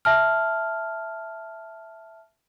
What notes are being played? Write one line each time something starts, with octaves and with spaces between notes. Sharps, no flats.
E5 A5 F6